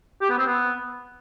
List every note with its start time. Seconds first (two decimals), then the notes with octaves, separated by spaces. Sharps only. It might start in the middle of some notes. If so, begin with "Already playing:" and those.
0.21 G4
0.30 B3
0.38 C4
0.47 B3